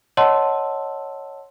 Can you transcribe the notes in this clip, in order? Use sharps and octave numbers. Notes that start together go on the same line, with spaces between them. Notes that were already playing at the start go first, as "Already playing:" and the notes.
C#5 D#5 F#5 A5 C6 E6